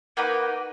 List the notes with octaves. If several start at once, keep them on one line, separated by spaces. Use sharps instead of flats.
A#3 D#4 F#4 B4